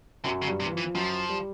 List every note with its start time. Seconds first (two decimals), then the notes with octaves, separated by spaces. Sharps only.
0.24 F#2 C3 F#3
0.42 C#3 F#3
0.47 G2 G3
0.60 C3
0.66 E3
0.71 F3
0.77 E3
0.84 F3
0.94 F#2 F3 F#3
1.29 G3